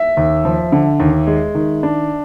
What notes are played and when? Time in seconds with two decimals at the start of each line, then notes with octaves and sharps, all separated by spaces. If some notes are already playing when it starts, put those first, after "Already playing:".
Already playing: E5
0.17 D#2
0.45 F3
0.72 D3
1.00 D#2
1.27 G#3
1.55 D#3
1.83 D4